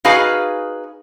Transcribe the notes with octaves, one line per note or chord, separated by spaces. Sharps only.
D#4 F#4 G#4 B4 F5 G#5